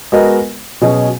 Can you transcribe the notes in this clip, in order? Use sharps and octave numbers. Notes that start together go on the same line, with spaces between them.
G#3 B3 F#4 A#4 D#5
B2 F#3 C#4 G#4 D#5